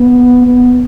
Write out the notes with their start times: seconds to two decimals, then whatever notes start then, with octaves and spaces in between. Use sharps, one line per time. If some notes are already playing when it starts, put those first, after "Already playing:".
Already playing: B3
0.42 B3